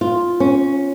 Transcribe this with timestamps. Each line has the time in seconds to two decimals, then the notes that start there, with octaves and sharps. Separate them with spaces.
0.01 F4
0.40 C#4